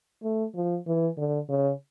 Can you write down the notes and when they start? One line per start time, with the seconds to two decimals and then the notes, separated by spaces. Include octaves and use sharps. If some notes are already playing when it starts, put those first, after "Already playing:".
0.23 A3
0.55 F3
0.87 E3
1.17 D3
1.49 C#3